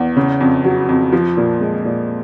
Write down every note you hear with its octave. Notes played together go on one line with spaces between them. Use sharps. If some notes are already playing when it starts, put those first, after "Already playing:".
Already playing: E2
C#3
F2
F#3
F2
F3
A#2
G#3
A#2